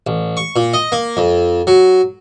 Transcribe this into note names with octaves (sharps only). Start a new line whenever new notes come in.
A1
C#6
A#2
D#5
A#3
F2
F#3